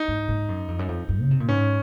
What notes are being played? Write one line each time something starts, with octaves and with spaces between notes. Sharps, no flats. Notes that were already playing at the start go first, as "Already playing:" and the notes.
Already playing: D#4
G#2
G#2
F#2
F2
F#2
F2
F#2
C#3
C3
A#2
G#2 C#4